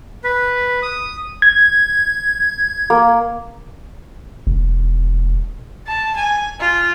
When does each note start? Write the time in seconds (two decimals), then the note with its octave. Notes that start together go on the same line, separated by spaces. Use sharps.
0.24 B4
0.82 D#6
1.42 G#6
2.90 A#3
4.47 E1
5.87 A5
6.17 G#5
6.60 F4